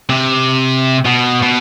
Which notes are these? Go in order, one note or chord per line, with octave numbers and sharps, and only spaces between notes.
C3
B2
B2